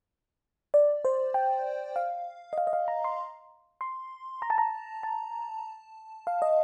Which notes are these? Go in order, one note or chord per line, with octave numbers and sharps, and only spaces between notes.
D5
C5
G5
F5
D#5
F5
D#5
F5
A#5
C6
C6
A#5
A5
A#5
A5
F5
D#5